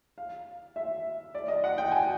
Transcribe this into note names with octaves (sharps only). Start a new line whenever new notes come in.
F5
E5
D5
D#5
F#5
G5
G#5